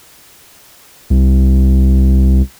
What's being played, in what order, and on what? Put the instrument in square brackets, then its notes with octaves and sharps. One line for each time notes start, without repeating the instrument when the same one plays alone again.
[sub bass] C2